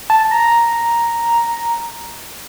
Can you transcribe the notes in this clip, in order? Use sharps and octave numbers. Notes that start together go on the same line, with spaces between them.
A5
A#5